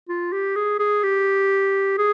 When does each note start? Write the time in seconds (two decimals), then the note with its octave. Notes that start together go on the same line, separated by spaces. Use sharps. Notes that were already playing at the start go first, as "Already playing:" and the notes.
0.09 F4
0.33 G4
0.56 G#4
0.79 G#4
1.03 G4
1.98 G#4